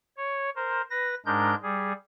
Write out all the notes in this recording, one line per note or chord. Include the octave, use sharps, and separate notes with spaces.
C#5
A#4 C5
B4 A#6
G#2 G#3 D4 A#4 G6
G3 G#4